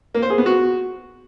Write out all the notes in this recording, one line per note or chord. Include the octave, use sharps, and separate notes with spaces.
A#3
C5
G#4
B3
F#4